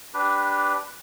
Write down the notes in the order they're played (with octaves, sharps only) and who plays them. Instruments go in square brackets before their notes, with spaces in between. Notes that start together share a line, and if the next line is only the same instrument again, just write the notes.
[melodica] D4 G4 B4